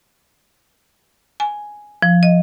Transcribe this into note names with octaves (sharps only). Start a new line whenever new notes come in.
G#5
F3
D#5